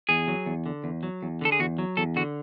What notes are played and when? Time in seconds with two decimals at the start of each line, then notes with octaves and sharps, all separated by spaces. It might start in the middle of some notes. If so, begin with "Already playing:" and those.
0.09 E2 G#4
0.28 F#3
0.46 E2
0.66 D3
0.84 E2
1.03 F#3
1.23 E2
1.41 D3 A4
1.52 G#4
1.59 E2 F#4
1.78 F#3
1.97 E2 A4
2.16 D3 F#4